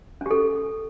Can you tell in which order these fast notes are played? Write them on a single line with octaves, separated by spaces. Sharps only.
C#4 G4 A4